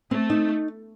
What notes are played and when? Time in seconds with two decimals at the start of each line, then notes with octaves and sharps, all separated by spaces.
0.11 A3 C4
0.30 D#4